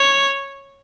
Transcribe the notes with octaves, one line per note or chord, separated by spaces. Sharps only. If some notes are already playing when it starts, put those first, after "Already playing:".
Already playing: C#5